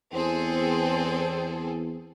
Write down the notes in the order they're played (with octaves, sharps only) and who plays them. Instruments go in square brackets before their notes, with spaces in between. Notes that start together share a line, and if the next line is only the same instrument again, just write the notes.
[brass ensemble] E2 [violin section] C4 G#4 A4 [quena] C5